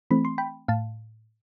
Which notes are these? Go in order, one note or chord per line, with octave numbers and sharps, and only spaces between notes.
E3 A3 C4 B5
C6
G5 B5
A2 F5 A5